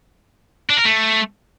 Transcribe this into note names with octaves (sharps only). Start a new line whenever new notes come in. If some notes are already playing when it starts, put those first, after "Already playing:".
D4
A#4
A3